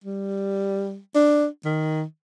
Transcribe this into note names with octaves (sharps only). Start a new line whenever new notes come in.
G3
D4
D#3